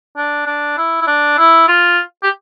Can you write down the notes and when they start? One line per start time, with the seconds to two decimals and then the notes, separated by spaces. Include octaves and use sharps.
0.17 D4
0.47 D4
0.78 E4
1.01 E4
1.07 D4
1.38 E4
1.68 F4
2.23 G4